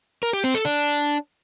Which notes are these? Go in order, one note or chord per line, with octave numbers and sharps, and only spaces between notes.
A#4
G4
C4
A4
D4